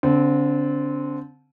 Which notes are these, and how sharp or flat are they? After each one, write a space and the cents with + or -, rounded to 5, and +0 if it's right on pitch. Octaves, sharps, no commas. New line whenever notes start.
D3 -30 C4 -10